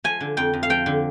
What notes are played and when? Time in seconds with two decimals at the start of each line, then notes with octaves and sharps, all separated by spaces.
0.04 F3 G#5
0.21 D3
0.37 F2 G5
0.53 F2
0.63 F5
0.70 F3 G5
0.86 D3